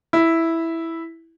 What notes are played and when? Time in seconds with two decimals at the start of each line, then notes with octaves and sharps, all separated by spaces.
0.13 E4